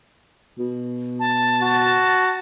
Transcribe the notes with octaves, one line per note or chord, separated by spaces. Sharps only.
B2
A5
F#4